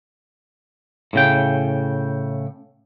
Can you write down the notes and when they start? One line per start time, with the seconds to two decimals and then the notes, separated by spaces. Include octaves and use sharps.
1.13 A2 C#3 G5